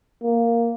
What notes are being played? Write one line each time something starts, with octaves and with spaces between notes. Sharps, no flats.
A#3